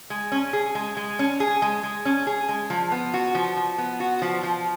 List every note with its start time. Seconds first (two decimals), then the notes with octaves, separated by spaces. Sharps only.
0.10 G#3
0.32 C#4
0.53 G#4
0.75 G#3
0.97 G#3
1.19 C#4
1.40 G#4
1.62 G#3
1.83 G#3
2.05 C#4
2.27 G#4
2.49 G#3
2.70 F3
2.92 B3
3.14 F#4
3.35 F3
3.57 F3
3.78 B3
4.00 F#4
4.22 F3
4.43 F3